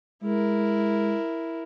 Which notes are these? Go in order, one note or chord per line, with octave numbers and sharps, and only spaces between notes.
G#3 E4 A#4